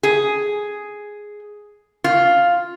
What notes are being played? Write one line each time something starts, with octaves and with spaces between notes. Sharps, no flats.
G#4
F4